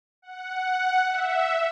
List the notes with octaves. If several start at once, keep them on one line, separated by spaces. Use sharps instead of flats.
F#5
E5